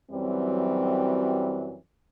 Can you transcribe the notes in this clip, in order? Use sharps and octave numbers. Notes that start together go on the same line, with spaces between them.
F#2 E3 F#3 G3 C4